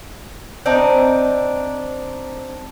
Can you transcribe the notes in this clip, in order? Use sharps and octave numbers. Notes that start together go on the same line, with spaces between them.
C4 D4 D#4